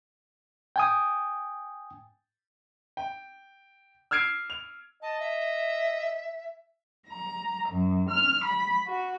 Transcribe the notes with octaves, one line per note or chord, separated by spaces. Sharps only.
G5 G#5 D#6
G5
E6 F6 G#6 C7 D7
F7
D#5 A5
E5
A#5
F#2
F6
B5
F#4